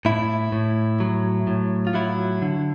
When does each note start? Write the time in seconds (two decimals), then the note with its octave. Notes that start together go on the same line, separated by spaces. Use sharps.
0.05 A2 E4
0.52 A2
1.00 F#3
1.47 A2
1.87 F4
1.94 F#3 E4
2.42 D3